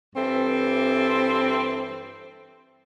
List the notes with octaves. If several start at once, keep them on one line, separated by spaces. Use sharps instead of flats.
G2 E3 C4 A4